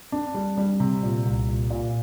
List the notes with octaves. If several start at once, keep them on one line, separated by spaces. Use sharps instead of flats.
D4
G3
G3
C3
A#2
C2
A#2
A#2